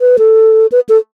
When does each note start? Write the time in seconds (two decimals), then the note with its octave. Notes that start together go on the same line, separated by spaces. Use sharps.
0.01 B4
0.19 A4
0.72 B4
0.89 A4